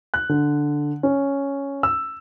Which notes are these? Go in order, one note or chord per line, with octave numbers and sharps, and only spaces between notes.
F#6
D3
C#4
E6